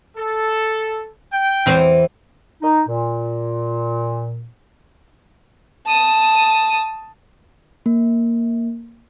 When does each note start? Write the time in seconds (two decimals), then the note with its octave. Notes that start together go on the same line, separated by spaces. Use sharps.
0.17 A4
1.32 G5
1.66 E2 E3 C4
2.62 D#4
2.87 A#2
5.87 A5 D#6
7.86 A#3